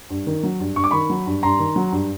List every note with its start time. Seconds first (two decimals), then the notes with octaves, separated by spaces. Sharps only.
0.10 G2
0.27 D#3
0.43 F#3
0.60 G2
0.76 G2 C#6
0.84 D6
0.91 D#3 B5 C#6
1.10 F#3
1.26 G2
1.43 G2 A#5 C6
1.59 D#3
1.76 F#3
1.92 G2